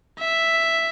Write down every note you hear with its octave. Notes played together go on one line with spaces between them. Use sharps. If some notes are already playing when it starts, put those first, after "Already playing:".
E5